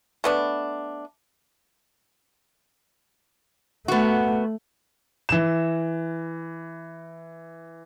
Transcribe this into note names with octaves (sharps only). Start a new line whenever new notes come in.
A3 B3 D4
A3 B3 F#4
E3 E7